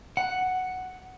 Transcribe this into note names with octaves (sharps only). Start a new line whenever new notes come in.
F#5